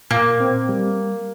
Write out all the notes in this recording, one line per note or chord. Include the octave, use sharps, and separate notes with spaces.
A#2 A#3
C4
G3